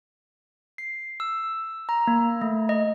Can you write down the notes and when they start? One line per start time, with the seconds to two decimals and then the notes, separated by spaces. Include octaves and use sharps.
0.78 C7
1.20 E6
1.89 A#5
2.07 A#3
2.42 A3
2.69 D#5